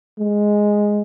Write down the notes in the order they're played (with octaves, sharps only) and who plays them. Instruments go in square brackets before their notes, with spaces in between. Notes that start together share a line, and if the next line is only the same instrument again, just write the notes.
[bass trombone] G#3